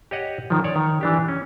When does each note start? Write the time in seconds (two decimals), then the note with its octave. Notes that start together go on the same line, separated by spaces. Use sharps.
0.11 G4 C#5 D#5 F#5
0.50 D#3 F3
0.64 C#5 D5
0.76 D#3
1.01 E3 D4 G4
1.28 C#4